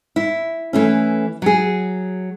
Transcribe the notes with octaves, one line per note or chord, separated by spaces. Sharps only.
E4
E3 A3 C#4
F#3 G#4